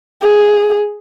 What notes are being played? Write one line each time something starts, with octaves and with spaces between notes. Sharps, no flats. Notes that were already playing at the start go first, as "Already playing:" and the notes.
G#4